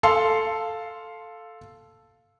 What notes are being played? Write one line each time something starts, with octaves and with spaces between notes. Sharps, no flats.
A4 F5 C6